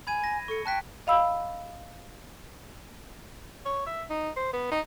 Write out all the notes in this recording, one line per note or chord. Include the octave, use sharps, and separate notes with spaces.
G#5 B5 G#6 D#7
A#6
A4 C#6 C#7
G5 A5 F#6 B6
D#5 F5 B5 E6
C#5
E5
D#4
C5
B3
D#4